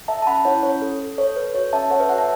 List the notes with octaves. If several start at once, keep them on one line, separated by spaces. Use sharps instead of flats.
A4 E5 A5
A5
C#4 F#5 B5
E4 C#5 F#5
C#4 C#5
A4
A4
A4 C#5
A4 B4
F#4 C#5
C#4 E5 A5
A4 C#5 F#5
B4 E5
F#4 C#5 F#5
E5 A5